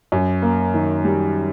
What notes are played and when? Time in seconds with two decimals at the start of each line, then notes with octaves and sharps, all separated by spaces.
0.12 F#2
0.42 A#3
0.74 D#3
1.05 G3